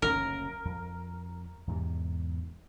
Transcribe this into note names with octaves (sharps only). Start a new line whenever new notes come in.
F#1 D2 C#4 A#4
F2
E2 G#2 C3